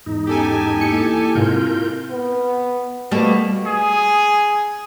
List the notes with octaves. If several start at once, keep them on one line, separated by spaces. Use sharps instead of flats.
E2 G#2 D#4
B3 C#4 G4 A4 G#5 A#5
A#3 E4 C#7
G#2 C3 C4 E4 F4 A#4 G6
B3
B2 G3 A3 A#3
G#4